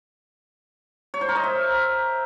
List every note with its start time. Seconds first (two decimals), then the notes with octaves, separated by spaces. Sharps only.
1.14 C#5
1.21 C5
1.29 A#4
1.36 D#5
1.44 E5